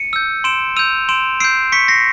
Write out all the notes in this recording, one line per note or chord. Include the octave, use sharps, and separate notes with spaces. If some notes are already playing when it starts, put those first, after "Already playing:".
Already playing: C#7 D#7
E6 G6
C6 D7 E7
E6 G6 D#7 F7
C6 D7 E7
E6 G6 C7 D7
C#6 B6 C#7
A#6 C7